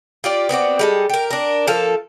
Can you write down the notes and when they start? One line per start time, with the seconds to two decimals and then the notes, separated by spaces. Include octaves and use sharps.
0.24 F4 G4 D5
0.49 B3 C4 F#4 D5
0.79 G3 G#3 A4
1.09 G4 A#4
1.31 D4 A#4
1.67 F3 A#3 A4 F5